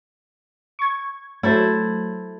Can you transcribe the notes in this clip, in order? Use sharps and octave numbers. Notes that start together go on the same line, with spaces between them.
C#6 G#6
F#3 A3 E4 A4 C5